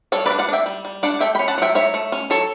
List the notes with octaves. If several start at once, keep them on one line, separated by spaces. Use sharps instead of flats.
G3 A4 C#5
B4 D5
D4
D5 F#5
D4
E5 G5
G3
G3
D4 D5 F#5
A3 E5 G5
C#4 G5 B5
F#5 A5
F#3 E5 G5
F#3 C#5 E5
A3
C#4
F#3 A4 C#5